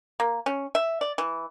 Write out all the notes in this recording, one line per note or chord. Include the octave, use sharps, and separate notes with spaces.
A#3
C#4
E5
D5
E3